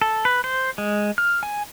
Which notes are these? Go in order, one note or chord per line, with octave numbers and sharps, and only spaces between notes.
A4
B4
C5
G#3
F6
G#5